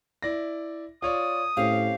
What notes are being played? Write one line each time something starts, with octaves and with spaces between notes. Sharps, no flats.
E4 D5 A#6
F4 C#5 D5 D#6
A2 C4 C#4 G4 F5